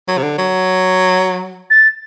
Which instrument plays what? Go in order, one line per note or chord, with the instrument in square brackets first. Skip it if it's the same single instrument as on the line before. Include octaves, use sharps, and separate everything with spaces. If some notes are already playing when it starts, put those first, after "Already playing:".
[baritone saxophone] F#3
C3
D3
F#3
[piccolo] A6